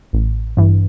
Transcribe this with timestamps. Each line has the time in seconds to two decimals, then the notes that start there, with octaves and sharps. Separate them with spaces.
0.13 A1
0.57 G2 E3